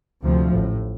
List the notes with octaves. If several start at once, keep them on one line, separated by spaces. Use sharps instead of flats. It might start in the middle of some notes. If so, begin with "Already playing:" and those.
D2 C3 F3
A2
A1